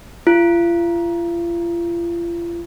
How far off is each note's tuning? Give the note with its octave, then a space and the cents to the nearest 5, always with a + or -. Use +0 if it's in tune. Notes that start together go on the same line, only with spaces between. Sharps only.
F4 -40